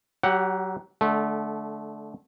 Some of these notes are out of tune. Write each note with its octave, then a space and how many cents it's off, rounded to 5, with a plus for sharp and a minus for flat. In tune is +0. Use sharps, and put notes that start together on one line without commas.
F#3 +25 G4 -5 F#5 +0
D3 +0 A3 -25